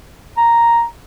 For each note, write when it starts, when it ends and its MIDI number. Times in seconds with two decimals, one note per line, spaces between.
0.37 0.83 82